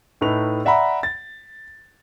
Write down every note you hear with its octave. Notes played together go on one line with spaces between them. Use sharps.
A2 A3 D#4 B4 F7
D5 E5 F#5 A#5 B5
A6